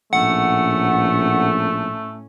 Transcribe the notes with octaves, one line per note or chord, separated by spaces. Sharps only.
A#1 A2 A3 C#4 F#5